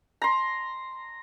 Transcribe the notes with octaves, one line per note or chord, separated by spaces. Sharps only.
A#5 C6